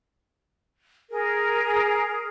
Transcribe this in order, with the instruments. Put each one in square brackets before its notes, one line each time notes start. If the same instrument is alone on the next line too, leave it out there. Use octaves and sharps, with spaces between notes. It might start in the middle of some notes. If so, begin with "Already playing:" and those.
[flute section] G#4 A#4